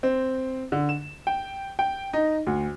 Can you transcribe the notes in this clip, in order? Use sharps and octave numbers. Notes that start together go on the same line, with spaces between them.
C4
D3
E7
G5
G5
D#4
D2